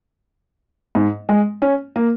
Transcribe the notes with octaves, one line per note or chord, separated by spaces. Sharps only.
G#2
G#3
C#4
A#3